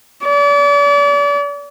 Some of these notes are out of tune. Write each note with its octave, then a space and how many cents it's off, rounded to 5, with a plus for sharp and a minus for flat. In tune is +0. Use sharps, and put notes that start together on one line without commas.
D5 -40